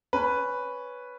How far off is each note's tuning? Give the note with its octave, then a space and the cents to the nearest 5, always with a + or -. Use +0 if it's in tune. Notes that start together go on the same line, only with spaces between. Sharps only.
C#4 +0 B4 +0